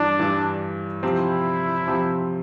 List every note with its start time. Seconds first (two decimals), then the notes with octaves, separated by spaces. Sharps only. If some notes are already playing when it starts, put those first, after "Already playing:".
Already playing: G2 E3 G3 D4
0.18 G2 E3 G3
1.03 C3 F3 C4 E4 G4
1.88 C3 F3 C4 G4